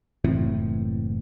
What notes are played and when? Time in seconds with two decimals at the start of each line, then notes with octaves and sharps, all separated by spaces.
0.24 F#1 A2 E3 C4